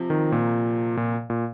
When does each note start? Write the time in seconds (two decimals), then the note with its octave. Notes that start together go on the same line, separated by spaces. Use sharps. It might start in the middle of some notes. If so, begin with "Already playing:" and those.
Already playing: C3 F3
0.10 D#3
0.32 A#2
0.97 A#2
1.30 A#2